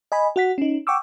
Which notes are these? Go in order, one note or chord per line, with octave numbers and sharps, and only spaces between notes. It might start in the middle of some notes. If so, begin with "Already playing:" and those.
D#5 G#5 B5
F#4 F#5 B6
C#4 D#4
F#5 G5 C#6 D6 E6